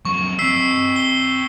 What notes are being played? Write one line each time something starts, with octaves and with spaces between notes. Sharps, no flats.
F#2 F3 C#6
C4 D#5 E6 B6 C7
G7